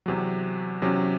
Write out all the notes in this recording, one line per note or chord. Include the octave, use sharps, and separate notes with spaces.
E2 C3 F#3
E2 C3 F#3 C#4